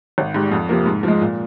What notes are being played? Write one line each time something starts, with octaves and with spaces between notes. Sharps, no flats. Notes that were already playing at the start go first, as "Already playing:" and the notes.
G#1
G#2 G3
F2
C3 F3 A#3
G#2
F3 G#3
A#2